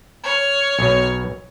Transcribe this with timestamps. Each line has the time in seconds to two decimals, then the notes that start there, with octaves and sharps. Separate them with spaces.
0.23 C#5 F6
0.79 B1 B2